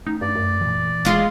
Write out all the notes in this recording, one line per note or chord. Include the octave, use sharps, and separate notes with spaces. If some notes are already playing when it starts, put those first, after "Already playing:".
A3 C#4 D#4
G2 D5
F#2
A#2 E3
D#1 G#3 F4